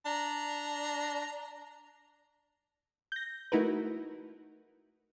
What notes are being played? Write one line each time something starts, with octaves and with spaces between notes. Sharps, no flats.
D4 A#5
G6 A#6
A3 D#4 E4 F#4 A#4 B4